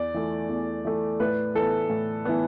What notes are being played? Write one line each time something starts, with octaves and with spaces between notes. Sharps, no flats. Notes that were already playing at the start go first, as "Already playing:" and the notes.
Already playing: E2 D5
E3 A3
E2
E3 A3
A2 B4
E3 B3 A4
A2
E3 B3